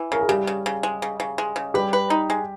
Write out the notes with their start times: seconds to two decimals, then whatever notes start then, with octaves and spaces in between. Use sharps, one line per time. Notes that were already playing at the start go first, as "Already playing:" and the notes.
Already playing: E3
0.12 C#3 A#4
0.21 G#4
0.29 C#3 G3 G4
0.47 C#3
0.66 C#3
0.83 G#3
1.02 C#3
1.20 C#3
1.38 G#3
1.56 C#3
1.74 G3 G4 B4
1.93 B4
2.10 D#4
2.30 G#3